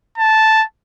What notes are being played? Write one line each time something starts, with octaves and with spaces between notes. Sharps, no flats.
A5